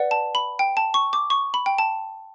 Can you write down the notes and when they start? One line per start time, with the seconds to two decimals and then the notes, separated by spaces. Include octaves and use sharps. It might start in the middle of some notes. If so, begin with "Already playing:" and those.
Already playing: B4 D5 F#5
0.11 A5
0.35 B5
0.59 G5
0.77 A5
0.94 C#6
1.13 D6
1.30 C#6
1.54 B5
1.66 G5
1.78 A5